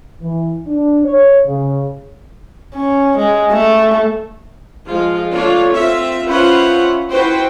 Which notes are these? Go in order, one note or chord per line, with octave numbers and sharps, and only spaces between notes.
E3
D4
C#5
C#3
C#4
G#3
A3
F3 G#3 F4
A3 D4 F4 C#5
C4 F4 E5
C#4 F4 B4 C5 E5 F#5
E4 F#4 B4 C5 G5